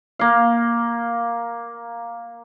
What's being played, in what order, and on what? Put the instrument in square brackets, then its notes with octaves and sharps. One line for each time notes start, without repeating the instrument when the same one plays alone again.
[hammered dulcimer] A#3 F5